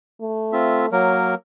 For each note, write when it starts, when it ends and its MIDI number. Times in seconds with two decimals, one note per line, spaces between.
0.21 0.91 57
0.52 0.86 60
0.52 0.86 65
0.52 0.86 76
0.92 1.35 54
0.92 1.35 58
0.92 1.35 70
0.92 1.31 73